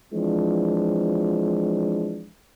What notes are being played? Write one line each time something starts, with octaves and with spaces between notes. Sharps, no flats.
E3 F3 G#3 C4 D4 F4